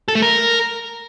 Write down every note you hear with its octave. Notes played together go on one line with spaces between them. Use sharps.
A4
A3
A#4